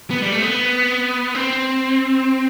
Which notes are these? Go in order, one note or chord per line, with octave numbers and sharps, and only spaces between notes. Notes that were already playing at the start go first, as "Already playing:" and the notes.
B3
G3
A3
B3
C4